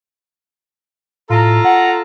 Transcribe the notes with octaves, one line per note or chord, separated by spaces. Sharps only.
A2 F4 A4 A#5
F#5